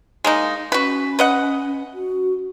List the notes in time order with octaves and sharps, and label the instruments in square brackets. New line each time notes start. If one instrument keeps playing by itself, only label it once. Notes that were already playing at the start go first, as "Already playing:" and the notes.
[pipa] G#3 A#3 D#4
[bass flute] C#4 [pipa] F#4 B4
[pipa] B4 D#5 F#5
[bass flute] F#4